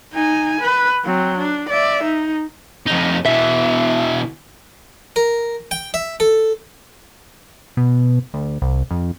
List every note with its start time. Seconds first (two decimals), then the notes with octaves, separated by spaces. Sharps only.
0.14 D#4 G#5
0.61 B4
1.05 F#3 C4
1.38 D4
1.70 D5 E5
2.04 D#4
2.87 F2 D#4
3.26 B2 E3 E5
5.16 A#4
5.71 G5
5.94 E5
6.20 A4
7.77 B2
8.34 D2
8.62 C2
8.91 F2